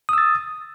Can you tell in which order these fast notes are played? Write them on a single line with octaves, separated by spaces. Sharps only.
D#6 E6 A6